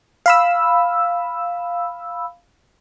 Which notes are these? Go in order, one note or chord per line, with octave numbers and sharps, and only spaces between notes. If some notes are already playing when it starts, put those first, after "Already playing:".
F5 B5 E6